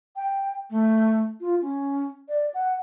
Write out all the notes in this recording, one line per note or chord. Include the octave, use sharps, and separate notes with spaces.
G5
A3
F4
C#4
D5
F#5